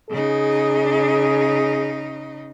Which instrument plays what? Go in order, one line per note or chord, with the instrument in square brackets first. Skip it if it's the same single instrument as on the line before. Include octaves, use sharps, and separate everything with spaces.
[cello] C#3 D#4 [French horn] G#4